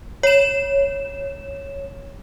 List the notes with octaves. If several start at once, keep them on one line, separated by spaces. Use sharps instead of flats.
C#5 E7